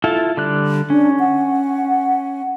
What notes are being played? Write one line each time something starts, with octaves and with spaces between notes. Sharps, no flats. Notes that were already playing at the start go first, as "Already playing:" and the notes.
E4 F4 A4
D3 G3 F#6
C#4 D4
F#5